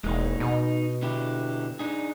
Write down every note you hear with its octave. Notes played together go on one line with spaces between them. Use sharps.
E1 G#3 A#3 D#4
B2 D#4
D3 E4 G4
D4 D#4 G#4